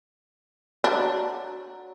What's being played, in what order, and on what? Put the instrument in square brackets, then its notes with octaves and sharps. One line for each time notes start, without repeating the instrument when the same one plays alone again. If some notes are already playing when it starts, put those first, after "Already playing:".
[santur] F#3 [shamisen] D4